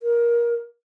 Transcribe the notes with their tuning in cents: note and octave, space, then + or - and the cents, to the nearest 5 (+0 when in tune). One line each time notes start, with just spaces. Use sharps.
A#4 +20